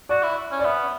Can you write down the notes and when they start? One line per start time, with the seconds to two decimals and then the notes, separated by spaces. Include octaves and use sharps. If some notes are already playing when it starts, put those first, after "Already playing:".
0.09 F#4 D5
0.23 E4
0.51 C#4
0.59 D5
0.64 B3 E5